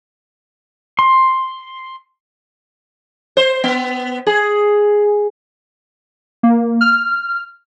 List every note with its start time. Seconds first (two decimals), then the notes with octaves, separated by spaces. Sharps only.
0.99 C6
3.37 C5
3.64 B3
4.27 G#4
6.43 A#3
6.81 F6